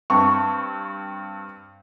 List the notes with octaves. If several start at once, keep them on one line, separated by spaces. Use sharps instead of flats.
G2 C4 C#6